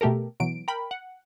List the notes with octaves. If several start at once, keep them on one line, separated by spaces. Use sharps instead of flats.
B2 A3 G4 A4 A#4
B2 E3 F#3 D7
A#4 G5 B5
F#5